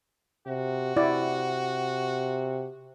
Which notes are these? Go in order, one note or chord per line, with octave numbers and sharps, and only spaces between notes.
C3 F#4
C3 E4 D5